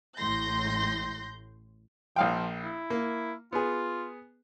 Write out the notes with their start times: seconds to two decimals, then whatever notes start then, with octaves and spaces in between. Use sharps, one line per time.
0.17 A1 A2 C6 G6 A#6
2.16 A#1 F3 F5 G5
2.64 E4
2.90 A#3
3.52 B3 F4 G#4